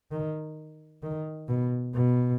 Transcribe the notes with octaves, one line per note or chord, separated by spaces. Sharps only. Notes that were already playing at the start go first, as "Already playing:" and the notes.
D#3
D#3
B2
B2